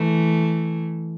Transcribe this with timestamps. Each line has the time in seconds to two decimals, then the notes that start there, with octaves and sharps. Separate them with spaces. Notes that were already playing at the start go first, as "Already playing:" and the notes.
Already playing: E3 A3